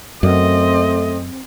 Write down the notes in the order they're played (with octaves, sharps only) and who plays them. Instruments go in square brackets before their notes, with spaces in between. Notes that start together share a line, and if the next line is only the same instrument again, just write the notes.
[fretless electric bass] F#2 [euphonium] A3 [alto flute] C4 [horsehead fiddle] D#5